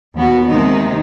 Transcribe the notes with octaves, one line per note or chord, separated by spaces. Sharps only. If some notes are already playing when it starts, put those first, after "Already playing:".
D#2 B3 F#4
D#2 C3 D#3 G#3 D#4